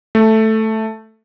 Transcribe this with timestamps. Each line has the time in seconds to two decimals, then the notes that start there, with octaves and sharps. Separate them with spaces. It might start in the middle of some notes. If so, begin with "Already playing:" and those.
0.15 A3